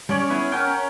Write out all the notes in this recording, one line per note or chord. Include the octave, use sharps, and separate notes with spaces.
G3 C#4 C#5 D5 C#6
B3 E4 G#4
C#4 A#4 F#5 G5 F6